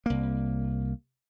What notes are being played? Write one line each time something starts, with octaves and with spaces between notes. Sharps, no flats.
C2 A#3